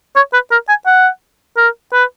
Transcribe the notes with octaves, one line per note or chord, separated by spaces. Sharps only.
C#5
B4
A#4
G#5
F#5
A#4
B4